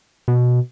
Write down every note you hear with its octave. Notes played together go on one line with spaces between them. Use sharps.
B2